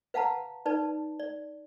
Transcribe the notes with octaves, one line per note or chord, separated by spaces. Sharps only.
B4 F5 F#5 A5 A#5
D#4 B4 D5 A5
D5